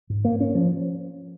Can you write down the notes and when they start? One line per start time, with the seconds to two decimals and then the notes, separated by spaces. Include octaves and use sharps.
0.10 G#2
0.25 A#3
0.41 C#4
0.55 F3